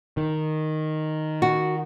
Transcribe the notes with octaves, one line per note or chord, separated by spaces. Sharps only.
D#3
F#4